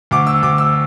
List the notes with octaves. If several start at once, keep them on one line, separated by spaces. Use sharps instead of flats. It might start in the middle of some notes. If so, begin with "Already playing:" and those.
D2 D6
E6
D2 D6
E6